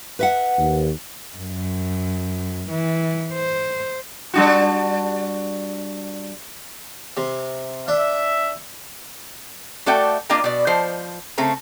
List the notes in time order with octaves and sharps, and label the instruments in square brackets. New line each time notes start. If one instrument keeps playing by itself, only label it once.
[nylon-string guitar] B4 E5 F#5
[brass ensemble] D#2
[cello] F#2
E3
C5
[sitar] G3 D4 F#4
[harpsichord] C3
[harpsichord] D4 [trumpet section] E5
[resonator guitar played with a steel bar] A3 F#4 A4 D5 E5 G5
A#3 D4 F4 D#5 G5 A#5
B2 D5
F3 C5 D#5
C#3 A3 C4 A#5